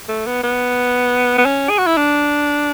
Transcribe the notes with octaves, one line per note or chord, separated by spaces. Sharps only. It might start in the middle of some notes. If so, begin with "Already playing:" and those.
A3
B3
B3
B3
C#4
G#4
F#4
E4
D4